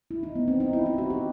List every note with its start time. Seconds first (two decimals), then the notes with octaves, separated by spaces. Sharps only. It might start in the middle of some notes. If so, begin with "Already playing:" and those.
0.11 E4
0.23 D#4
0.35 B3
0.48 C4
0.60 D#4
0.73 E4
0.86 E4
0.98 F#4
1.10 G4